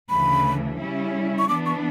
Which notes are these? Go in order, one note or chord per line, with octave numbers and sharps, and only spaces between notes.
D2 C#3 E3 B5
C#3 G3 C#4 E4
C#6
E3 B3 D4 D6
C#6